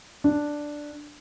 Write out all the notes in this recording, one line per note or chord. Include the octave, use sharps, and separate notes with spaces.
D4